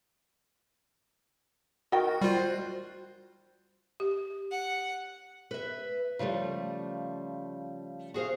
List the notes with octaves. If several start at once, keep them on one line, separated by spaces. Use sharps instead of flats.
D#3 F#4 A#4 G5
G3 F4 C5
G4
F#5
B4 E5
C#3 F3 G3 A3
F#4 G#4 C5 F5